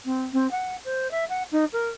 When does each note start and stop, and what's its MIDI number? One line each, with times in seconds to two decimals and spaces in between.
0.05 0.22 60
0.33 0.50 60
0.51 0.76 78
0.84 1.10 72
1.11 1.25 76
1.29 1.43 78
1.51 1.65 63
1.73 1.89 70